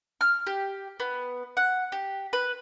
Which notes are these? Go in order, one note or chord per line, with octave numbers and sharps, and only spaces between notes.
F6
G4
B3
F#5
G4
B4